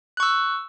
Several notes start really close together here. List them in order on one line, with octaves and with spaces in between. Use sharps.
F#6 C#6 E6